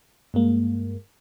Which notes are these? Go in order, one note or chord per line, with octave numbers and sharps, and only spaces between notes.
G2 G#3 A#3